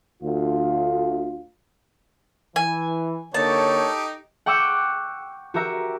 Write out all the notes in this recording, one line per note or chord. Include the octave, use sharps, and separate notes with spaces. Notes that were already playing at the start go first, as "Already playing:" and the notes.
D2 F4
E3 G#5
D3 A#3 D#4 G4 A4 C#5 A5
F#5 G5 C#6 D6 E6 G6
F#4 G4 A#4 E5 A#5